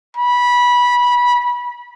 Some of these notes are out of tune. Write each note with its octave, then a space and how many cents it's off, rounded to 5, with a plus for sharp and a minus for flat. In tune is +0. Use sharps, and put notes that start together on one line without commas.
B5 -20